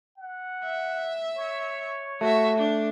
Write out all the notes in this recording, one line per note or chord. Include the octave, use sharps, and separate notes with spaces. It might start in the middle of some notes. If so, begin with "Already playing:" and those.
F#5
E5
C#5
A3 F#4 E5
D4